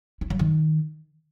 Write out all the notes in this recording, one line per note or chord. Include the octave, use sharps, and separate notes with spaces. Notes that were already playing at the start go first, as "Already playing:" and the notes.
E4
F#3
D#3